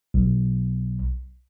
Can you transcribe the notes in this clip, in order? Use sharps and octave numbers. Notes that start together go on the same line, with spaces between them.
B1